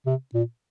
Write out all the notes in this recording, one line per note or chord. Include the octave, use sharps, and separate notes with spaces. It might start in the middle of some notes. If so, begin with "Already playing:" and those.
C3
A#2